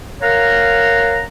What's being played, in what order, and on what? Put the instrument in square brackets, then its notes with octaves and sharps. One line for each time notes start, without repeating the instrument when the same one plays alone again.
[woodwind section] A#4 C#5 F5 F#5 A#5